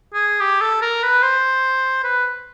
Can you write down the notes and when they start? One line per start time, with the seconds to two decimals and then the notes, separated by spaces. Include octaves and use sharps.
0.14 G#4
0.40 G4
0.61 A4
0.82 A#4
1.03 B4
1.23 C5
2.04 B4